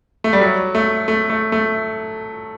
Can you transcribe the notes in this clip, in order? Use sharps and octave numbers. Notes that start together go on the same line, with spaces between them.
A3
G3
F#3
A3
A3
A3
A3